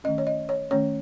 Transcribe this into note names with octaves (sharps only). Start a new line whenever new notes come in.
D#3 A3 C#4 D#5
C#5
D#5
C#5
D#3 A3 C#4 C#5